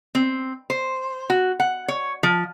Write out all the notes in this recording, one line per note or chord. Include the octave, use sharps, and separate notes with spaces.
C4
C5
F#4
F#5
C#5
F3